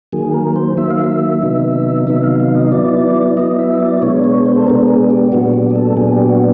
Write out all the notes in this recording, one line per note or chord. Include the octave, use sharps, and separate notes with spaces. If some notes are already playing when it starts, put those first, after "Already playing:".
D#3 F#3 A#3 G#4
A#4
C5
D#3 F#3 A#3 E5
F5
E5
C3 D#3 F#3 B3 D#4
C3 D#3 F#3 B3 D#4 E5
F5
F5
D#5
F#3 B3 E4 D5
F#3 B3 E4 D#5
E5
D#5
D5
B2 G#3 B3 D4 C#5
C#5
C5
A4
B2 G#3 B3 D4 A#4
G#4
G4
A#2 F#3 B3 D4 F#4
G4
G#4
A4
A#2 F#3 B3 D4 G#4
G4
F#4